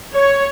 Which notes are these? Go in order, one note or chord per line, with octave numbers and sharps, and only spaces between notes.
C#5